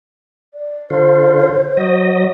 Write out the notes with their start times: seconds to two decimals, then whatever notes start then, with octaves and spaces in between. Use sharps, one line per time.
0.54 D5
0.90 D3 F4 C5
1.77 F#3 D#5